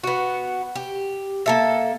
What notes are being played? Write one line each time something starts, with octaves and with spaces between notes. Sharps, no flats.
B3 F#4
G4
A#3 A4 E5